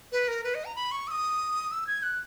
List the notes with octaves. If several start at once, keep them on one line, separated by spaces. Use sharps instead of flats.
B4
A#4
B4
D#5
A#5
B5
C#6
E6
D#6
E6
G#6
F#6